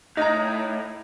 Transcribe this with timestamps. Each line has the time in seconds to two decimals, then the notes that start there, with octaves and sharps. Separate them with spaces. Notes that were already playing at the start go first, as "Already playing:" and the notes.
0.17 A2 D#4 A#5